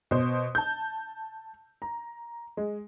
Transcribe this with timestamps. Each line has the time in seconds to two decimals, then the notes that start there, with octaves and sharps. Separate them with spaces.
0.11 B2 C5
0.55 A5 G6
1.82 A#5
2.57 G#3